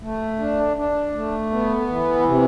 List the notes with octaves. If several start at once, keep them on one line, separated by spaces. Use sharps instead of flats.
A3
D4
D4
A3
B3
E3
C3